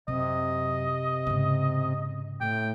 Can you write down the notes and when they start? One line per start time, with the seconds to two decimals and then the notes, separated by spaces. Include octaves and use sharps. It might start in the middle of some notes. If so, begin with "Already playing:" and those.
0.08 F#2 C3 D#5
1.27 G#2 C#3
2.41 A2 G5